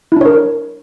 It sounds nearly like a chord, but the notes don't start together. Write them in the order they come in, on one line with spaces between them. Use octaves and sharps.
E4 D4 C#5 A#4